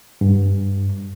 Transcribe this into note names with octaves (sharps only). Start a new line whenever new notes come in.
G2